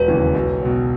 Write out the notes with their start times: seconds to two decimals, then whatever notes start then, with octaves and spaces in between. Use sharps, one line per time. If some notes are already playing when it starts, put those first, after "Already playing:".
Already playing: E1 B4
0.08 D#2 C#3 E3
0.35 B1
0.61 B2 F#3